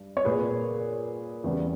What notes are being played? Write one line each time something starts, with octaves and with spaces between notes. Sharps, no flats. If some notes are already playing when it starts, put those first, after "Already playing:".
Already playing: G2
C#5
A#2 A#3 G#4 B4
E2 C#3 G3